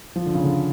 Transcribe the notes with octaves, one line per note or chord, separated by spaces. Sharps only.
F3
D3
C#3
D3